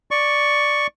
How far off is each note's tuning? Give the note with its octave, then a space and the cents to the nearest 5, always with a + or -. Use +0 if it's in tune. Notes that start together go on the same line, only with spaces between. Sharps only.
D5 +0 C#6 +0